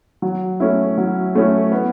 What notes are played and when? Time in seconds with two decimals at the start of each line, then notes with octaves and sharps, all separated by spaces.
0.22 F#3
0.60 A3 C#4 E4
0.98 F#3
1.35 A3 C#4 E4
1.72 B3